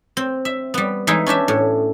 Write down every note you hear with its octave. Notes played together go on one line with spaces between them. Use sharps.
C4
E5
G3 B3
E3 G#3 D#4 E4
C#4 D4 G4 E5
A2